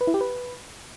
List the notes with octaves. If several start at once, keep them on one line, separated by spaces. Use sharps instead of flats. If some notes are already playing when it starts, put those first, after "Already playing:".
B4
E4
G4
B4